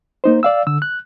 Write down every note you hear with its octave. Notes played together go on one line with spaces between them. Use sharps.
A#3 D#4 C5
D5 F5 E6
D3 E6
F#6